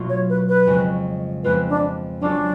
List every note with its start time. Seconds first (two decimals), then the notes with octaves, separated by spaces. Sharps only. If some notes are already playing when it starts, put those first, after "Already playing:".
Already playing: B2 F#3 A3 D4 F4
0.09 C#5
0.29 B4
0.49 B4
0.67 F2 C#3 G#3 C#4
1.44 F2 F3 G#3 B3 F4 B4
1.69 D4
2.21 F#3 C#4 D4 F4 A4